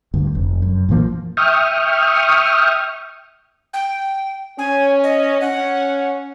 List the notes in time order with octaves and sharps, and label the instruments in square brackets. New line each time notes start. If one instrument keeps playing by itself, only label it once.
[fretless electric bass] D2 G2
F1
F#2
A#1 E3 F3 A#3
[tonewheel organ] E5 G5 C#6 D#6 F6
[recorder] G5
[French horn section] C#4 [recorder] G#5
[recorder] D#5
[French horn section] C#4 [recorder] F#5